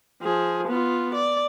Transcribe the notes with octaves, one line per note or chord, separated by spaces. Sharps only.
F3 G#4
B3 F4
D5